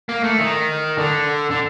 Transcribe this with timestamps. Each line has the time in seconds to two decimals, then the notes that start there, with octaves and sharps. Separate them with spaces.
0.09 A#3
0.23 A3
0.39 D#3
0.98 D3
1.51 D3